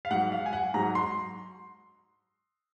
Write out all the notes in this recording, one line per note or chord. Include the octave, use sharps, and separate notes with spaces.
F5
G#2 F#3 F#5
F5
G#5
F#5
G#2 F#3 A#5
C6